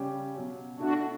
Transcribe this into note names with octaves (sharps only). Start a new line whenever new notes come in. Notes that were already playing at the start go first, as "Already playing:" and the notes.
Already playing: C#3 G3 C#4 G4
B2 F#3 C#4
B2 A3 D4 E4 F#4 A4